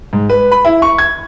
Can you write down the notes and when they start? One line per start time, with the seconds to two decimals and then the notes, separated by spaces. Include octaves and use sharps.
0.13 G#2
0.29 B4
0.52 B5
0.65 E4
0.82 C#6
0.98 G#6